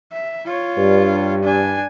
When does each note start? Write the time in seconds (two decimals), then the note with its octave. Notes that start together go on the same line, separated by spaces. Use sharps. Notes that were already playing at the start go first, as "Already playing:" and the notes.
0.12 E5
0.46 F4 C#5
0.78 G2
1.43 D4 G#5